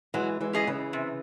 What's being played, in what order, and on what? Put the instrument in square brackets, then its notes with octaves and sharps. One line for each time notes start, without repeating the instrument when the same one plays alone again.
[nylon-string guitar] E3 G#3 [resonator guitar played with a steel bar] F#3
[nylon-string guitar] E3 G#3
[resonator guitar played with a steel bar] C#4 G#4 D#5
[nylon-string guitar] C#3 E3
[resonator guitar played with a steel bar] C3